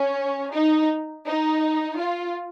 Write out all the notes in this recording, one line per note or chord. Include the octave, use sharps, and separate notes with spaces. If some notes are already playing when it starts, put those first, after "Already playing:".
Already playing: C#4
D#4
D#4
F4